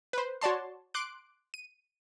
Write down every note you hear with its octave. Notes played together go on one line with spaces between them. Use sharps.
B4 C5
F#4 C#5 D5 A5 C6
C6 D6 F#6 D7
D#7